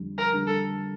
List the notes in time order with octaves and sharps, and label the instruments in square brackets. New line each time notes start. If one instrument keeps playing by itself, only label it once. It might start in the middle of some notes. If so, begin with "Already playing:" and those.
Already playing: [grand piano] F2 D3 G3
[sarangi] A#4
[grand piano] D3 G3
[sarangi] A4